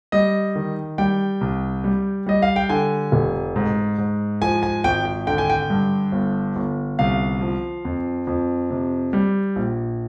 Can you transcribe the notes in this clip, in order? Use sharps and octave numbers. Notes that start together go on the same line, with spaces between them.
G3 D#5
D#3
G3 G5
C2
G3
G3 D#5
F5
G5
D3 G#5
F1
G#2
G#2
F3 G#5
G#5
G#1 G5
G5
D3 G5
G#5
G5
G2
G1
G1
C2 F5
F3
F2
F2
C3
G3
A#1